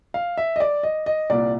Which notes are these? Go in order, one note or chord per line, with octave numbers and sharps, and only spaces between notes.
F5
E5
D#5
D5
D#5
D#5
C2 A#2 D5